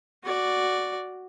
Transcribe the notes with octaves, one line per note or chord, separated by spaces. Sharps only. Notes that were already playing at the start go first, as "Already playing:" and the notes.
F#4 D5